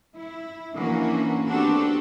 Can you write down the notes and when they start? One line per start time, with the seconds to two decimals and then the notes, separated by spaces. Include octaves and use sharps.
0.15 E4
0.75 E3 F3 A#3 C#4 D4 F#4
1.48 B3 C4 D4 F#4 G4 A4